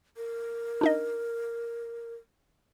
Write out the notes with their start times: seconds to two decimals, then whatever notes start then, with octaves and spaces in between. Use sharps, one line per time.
0.17 A#4
0.81 D4 D#4 D#5